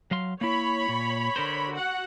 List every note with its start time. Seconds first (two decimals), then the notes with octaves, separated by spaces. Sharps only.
0.11 F#3 F5 C6
0.41 A#3 E4 C#5 B5
0.89 A#2
1.36 D3 A#4 C5
1.71 F#4 F#5